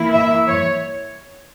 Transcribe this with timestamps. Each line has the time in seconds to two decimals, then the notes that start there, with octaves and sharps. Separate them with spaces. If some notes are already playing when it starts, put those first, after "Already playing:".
Already playing: E3 A#3 E4
0.12 E5
0.47 C#5